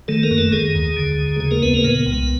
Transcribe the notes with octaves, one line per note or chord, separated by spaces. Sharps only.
D#3 A3 A4
A#3 A#4
F#2
A3 A4
D#3 G#3 G#4
D#2
D3
D#2
C#3 G#3 G#4
A#3 A#4
G#3 B3 B4
A#3 A#4
A#2 B3 B4
C2